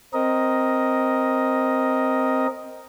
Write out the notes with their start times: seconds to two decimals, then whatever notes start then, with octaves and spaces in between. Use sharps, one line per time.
0.13 C4 A#4 D#5